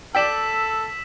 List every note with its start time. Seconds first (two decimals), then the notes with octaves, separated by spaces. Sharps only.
0.15 A4 D5 G5 E6 B6 E7